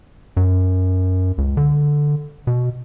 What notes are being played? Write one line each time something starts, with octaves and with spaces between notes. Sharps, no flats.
F#2
C#2
D3
B2